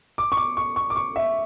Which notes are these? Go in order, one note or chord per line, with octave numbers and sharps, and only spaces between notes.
D6
C#6
D6
C#6
C#6
D6
C#6
E5